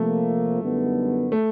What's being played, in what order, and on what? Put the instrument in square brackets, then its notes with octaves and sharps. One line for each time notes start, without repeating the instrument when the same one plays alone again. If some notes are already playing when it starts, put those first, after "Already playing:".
Already playing: [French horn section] C3 F3 A#3 [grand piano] A3
[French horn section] F#2 D3 G3 B3 D#4
[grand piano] A3